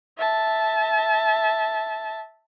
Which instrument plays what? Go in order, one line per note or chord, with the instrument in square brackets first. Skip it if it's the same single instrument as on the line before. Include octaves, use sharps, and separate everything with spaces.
[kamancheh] E5 A5